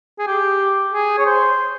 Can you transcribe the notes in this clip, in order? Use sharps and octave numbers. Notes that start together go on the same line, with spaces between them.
G#4
G4
G#4
C#5
C5